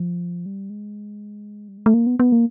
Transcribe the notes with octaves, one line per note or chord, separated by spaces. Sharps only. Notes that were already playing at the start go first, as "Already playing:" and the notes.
Already playing: F3
G3
G#3
G3
G#3
A3
A#3
B3
B3
A#3